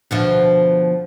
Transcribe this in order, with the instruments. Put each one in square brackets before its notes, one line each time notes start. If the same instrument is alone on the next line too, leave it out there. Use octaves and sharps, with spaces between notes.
[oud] D2 B2 F3